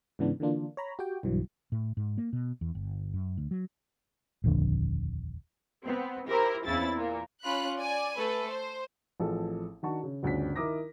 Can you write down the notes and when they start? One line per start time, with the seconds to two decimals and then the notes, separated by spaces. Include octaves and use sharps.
0.19 G#2 C#3 E3 B3 D4
0.40 D3 E3 A#3 D4 F4
0.77 C#5 A#5 B5
0.99 F#4 G4 G5
1.23 B1 G2 E3 F#3
1.72 A2
1.97 G#2
2.18 A#3
2.33 B2
2.61 E2
2.75 G1
3.14 F#2
3.37 D2
3.51 F#3
4.44 D#1 A#1 F2 D3
5.83 B3 C4
6.28 E4 G4 A#4 C5
6.64 E2 C#3 C4 E4 A6
6.96 A#2
7.44 C#4 F4 B5 F#6
7.77 D5 G#5
8.17 A3 A4 B4
8.49 C5
9.20 A1 F3 C4 G#4 A4
9.83 D#3 D4 F#4 A5 C#6
10.03 C#3
10.23 G1 D2 C#3 D4 B6
10.56 D#3 E4 A#4 D6 D#6 A#6